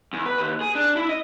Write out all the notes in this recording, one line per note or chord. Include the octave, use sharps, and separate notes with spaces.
E2
B4
D#2
G#4
D4
E4
D#5